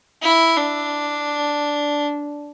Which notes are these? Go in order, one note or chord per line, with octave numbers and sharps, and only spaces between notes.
E4
D4